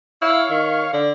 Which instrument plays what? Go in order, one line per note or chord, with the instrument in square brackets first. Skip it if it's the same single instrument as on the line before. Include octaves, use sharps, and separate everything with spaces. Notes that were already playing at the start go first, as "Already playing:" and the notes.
[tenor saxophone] E4 [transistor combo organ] C#5 F5
[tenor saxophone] D#3
D3